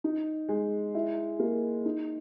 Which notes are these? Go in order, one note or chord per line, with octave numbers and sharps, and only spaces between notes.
D#4
G#3
E4
A#3
D#4